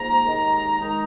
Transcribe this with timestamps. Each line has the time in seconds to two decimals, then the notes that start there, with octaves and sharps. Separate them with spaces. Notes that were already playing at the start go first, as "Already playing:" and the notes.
Already playing: G#2 F3 A#3 A#5
0.26 D#2 D#3 G#3 D#4
0.80 D#3 G#3 D#4 A#5